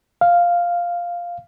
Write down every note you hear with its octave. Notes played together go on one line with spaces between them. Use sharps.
F5